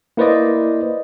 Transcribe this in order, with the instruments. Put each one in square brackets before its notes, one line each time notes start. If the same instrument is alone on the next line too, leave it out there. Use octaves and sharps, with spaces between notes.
[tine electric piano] A#3 E4 B4 C5 D5 D#5